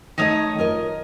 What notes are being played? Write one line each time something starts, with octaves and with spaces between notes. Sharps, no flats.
D#3 A3 D#4 C#5 D#5 D#6
F4 A#4 D#5